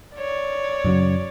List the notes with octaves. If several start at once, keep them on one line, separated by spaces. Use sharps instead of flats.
C#5 D5
F#2 C#3 F#3